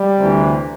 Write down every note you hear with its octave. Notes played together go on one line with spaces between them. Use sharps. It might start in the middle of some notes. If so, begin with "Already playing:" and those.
Already playing: G3
D2 C3 E3